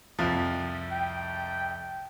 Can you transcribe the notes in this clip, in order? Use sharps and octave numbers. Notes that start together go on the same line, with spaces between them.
C2 F2 F3
G5